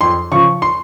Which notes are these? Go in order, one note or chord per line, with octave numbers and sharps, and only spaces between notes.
F2 C6
C#3 F3 C#6
C6